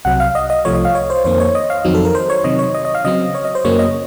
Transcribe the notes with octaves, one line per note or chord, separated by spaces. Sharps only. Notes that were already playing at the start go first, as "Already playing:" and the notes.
C2 C3 F#3 F#5
F5
D#5
D#5
C2 C3 F3 A3 C#5
D#5
F5
C#5
C5
F2 D#3 A#3 C5
C#5
D#5
F5
F2 D#3 F#3 C4 D#4
A4
A#4
C5
C#5
C3 D#3 F#3 D#5
C#5
D#5
D#5
F5
C#3 F#3 C4 D#5
C#5
D#5
C5
F#2 C#3 F#3 A#3 C#4 C#5
D#5